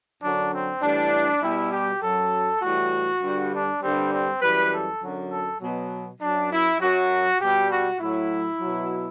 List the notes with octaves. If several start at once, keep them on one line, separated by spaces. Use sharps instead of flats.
F#2 D3 F#3 D4
C4
A2 E3 G3 D4
B2 G3 E4
G4
F#2 F#3 A4
A2 E3 G3 F#4
G2 D3 G3
D4
G2 D3 G3 C4
C4
F#2 E3 G3 B4
A4
F#2 D3 F#3
A4
B2 F#3
F#2 F#3 D4
E4
F#2 F#3 F#4
B2 G3 G4
F#4
A2 F#3 E4
B2 F#3